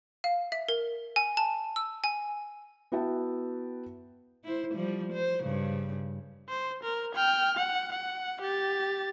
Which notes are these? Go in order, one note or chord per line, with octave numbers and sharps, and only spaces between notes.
F5
E5
A#4
G#5
A5
E6
G#5
B3 E4 F#4 E5 G5 A5
E4 C5
F3 G3
C5
G2 C#3
C5
A#4
G5 F6
F#5
F#5
G4 A6